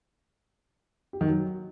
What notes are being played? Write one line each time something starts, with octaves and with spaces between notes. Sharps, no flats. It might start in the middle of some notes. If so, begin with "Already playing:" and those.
G4
D#3
F#3